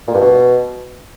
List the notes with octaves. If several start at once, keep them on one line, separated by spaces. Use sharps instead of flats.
A#2
G2
B2